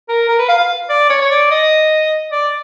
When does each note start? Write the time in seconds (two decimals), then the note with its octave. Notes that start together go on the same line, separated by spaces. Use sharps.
0.09 A#4
0.29 A#4
0.39 B4
0.49 F5
0.59 F5
0.89 D5
1.10 C#5
1.21 C#5
1.30 D5
1.51 D#5
2.31 D5